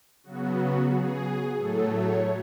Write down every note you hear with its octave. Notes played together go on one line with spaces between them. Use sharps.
C#3 F#3 B3 F#4
F#4
G#4
A2 F#3 A3 A4
C#5